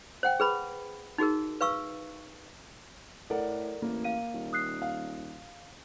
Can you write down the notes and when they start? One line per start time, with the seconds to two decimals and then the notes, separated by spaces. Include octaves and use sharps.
0.23 C5 F#5 G5
0.40 G#4 B4 B5
1.18 D#4 F#4 G#4 A#4
1.61 B4 F5 C#6 E6
3.30 A2 A4 A#4 D5 F#5
3.82 A1 A#3
4.04 F5 D#7
4.33 D#1
4.53 D#6 F#6 C7
4.82 F5